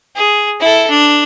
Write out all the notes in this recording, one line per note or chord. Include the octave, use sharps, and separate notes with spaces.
G#4
E4 A4
D4